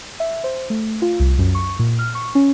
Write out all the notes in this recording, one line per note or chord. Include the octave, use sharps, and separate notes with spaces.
E5
C5
A3
F4
C2
F#2
C#6
A#2
F6
C#6
C#4